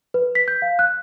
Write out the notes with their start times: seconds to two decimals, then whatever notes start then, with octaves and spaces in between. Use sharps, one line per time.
0.14 B4
0.35 B6
0.48 G6
0.62 F5
0.79 F#6